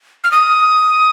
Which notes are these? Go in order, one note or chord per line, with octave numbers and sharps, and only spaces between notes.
F6
D#6